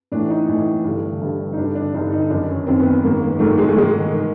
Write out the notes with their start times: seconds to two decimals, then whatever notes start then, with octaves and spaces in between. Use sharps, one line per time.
0.12 A2 E3 D4
0.30 D#4
0.48 A2 E3
0.84 G2 D3
1.21 G2 D3
1.53 D#4
1.57 G2 D3 D4
1.75 D4
1.94 G2 D3 D#4
2.12 D#4
2.30 F#2 D#3 D4
2.49 C#4
2.66 F#2 D#3 C4
2.79 B3
3.03 G#2 D#3 A#3
3.22 A#3
3.39 G#2 D#3 A3
3.58 G#3
3.68 A3
3.76 G#2 D#3 G#3
4.13 D#3